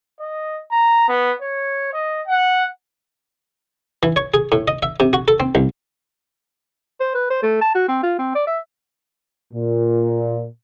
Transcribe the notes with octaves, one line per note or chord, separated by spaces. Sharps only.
D#5
A#5
B3
C#5
D#5
F#5
E3
C#5
G#4
A2
D#5
E5
C3
F#4
A4
C4
C2
C5
B4
C5
A3
A5
F#4
C4
F4
C4
D5
E5
A#2